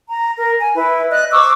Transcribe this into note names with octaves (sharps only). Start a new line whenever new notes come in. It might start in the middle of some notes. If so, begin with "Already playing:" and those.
A#5
A#4
G#5
E4 B4
D5 D#5 F#6
C5 C#6 D6 E6